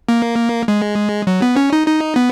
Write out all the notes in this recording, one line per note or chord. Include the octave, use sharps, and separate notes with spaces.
A#3
G#3
F#3
B3
C#4
D#4
D#4
B3